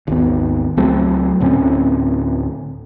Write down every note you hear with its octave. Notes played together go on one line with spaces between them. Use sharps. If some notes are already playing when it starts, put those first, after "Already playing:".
G#1 D#2 B3
C#2 F#3 A3 C4
D2 A2 C4 C#4